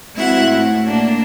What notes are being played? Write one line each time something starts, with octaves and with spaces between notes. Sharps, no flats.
G#3 C4 E4 F#4 E5 F#5
A2
A#3 D4